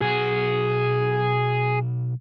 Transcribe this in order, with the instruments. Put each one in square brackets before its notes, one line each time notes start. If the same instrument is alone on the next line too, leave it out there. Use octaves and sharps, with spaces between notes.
[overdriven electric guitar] B1 F#4 [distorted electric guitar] G#4